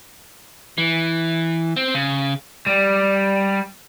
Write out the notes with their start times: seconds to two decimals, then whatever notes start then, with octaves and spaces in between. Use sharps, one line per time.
0.78 E3
1.76 C4
1.94 C#3
2.66 G3